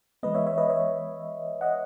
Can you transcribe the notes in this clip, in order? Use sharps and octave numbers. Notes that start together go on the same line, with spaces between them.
E3 G#3 B3 B4 D#5
C#5 E5
C#5 E5
B4 D#5
C#5 E5
D#5 F#5